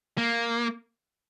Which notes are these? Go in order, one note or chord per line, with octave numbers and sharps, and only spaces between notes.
A#3